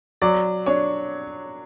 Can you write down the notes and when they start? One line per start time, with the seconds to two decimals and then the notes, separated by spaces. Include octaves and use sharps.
0.22 F#3 D5
0.66 D4 C#5